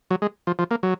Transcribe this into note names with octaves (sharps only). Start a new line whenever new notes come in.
F#3
G#3
F3
F3
A#3
F#3